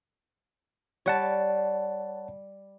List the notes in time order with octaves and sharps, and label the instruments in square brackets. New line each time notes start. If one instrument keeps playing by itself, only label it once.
[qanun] G3 [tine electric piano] C#5 F#5 A5